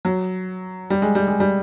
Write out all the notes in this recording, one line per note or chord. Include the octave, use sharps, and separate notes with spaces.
F#3
G3
G#3
G3
G#3
G3